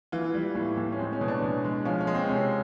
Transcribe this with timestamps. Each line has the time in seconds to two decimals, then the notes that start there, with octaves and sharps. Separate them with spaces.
0.12 E3 F4
0.34 G3
0.55 A2
0.77 A2
0.92 C#4
0.99 G#3 C4
1.13 C#4
1.21 B2
1.28 D4
1.42 B2
1.65 G#3
1.85 F3 C#4
2.01 C#4
2.07 G#3
2.15 C4
2.28 C3 C#4